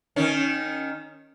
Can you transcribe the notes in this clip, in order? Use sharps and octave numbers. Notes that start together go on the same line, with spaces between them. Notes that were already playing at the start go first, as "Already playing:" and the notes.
D#3 C#4